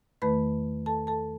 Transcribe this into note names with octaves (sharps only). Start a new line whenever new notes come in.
E2 D#3 A3 B4 B5
A4 A5
A4 A5